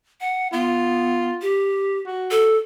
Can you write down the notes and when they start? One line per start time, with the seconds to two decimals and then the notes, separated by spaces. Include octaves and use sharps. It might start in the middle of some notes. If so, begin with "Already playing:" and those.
0.21 F#5
0.53 B3 F4
1.42 G4
2.06 F#4
2.31 A4